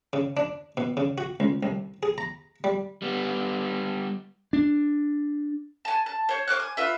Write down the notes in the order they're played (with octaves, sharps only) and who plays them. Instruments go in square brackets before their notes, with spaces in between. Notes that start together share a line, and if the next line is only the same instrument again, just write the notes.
[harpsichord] C#3
D4
B2
C#3
F#4
C#2
C2
G#4
A#5
G3
[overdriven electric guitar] G3 B3
[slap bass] D4
[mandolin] G#5 A5
A5
C5 C#5
C5 D6 F6 F#6
G#5
F4 B4 E5